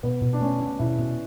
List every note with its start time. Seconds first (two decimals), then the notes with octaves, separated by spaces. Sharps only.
0.03 B2 B3
0.21 B2
0.33 D4
0.41 A3 C#4
0.60 D4
0.79 B2 E4
0.98 B2